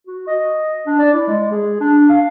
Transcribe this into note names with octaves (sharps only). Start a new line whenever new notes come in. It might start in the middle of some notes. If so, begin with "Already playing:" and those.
F#4
D#5
D4
D5
E4
G#3
G#4
D4
F5